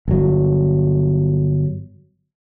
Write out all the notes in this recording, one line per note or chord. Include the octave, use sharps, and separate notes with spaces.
G1 F#3